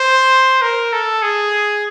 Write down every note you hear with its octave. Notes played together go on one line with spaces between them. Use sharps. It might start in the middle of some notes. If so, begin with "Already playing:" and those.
Already playing: C5
A#4
A4
G#4